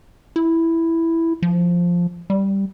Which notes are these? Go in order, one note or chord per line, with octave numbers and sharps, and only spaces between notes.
E4
F3
G3